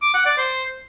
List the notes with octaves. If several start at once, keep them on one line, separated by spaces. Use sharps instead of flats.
D6
F#5
D5
C5